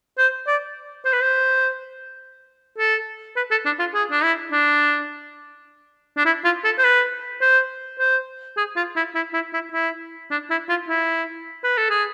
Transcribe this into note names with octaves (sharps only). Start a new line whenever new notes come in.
C5
D5
C5
B4
C5
A4
B4
A4
D4
F4
G#4
D4
E4
D4
D4
E4
F4
A4
C5
B4
C5
C5
G#4
F4
E4
E4
E4
E4
E4
D4
E4
F4
E4
B4
A4
G#4